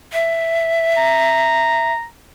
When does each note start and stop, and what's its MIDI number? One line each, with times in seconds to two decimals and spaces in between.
0.13 1.93 76
0.97 2.05 82